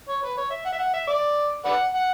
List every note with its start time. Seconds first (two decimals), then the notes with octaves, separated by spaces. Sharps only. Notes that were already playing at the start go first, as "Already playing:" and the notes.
0.09 C#5
0.23 B4
0.37 C#5
0.51 E5
0.65 F#5
0.73 E5
0.79 F#5
0.94 E5
1.08 D5
1.65 B4 D5 F#5
1.94 F#5